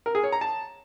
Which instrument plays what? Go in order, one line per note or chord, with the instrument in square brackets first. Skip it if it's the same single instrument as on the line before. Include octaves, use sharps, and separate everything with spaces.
[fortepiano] A#4
G#4
C#5
A#5
A5